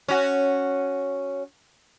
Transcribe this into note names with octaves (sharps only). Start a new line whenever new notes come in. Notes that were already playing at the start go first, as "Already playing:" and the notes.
C#4 F#4